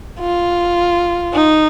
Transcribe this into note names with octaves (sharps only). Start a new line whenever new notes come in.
F4
D#4